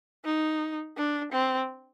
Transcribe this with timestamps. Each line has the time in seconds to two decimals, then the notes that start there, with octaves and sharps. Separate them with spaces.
0.25 D#4
0.97 D4
1.32 C4